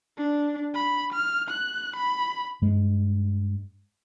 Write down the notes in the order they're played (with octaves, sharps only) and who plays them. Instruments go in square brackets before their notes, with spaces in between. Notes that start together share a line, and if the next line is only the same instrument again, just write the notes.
[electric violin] D4
B5
F6
F#6
B5
[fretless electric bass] G2 G#3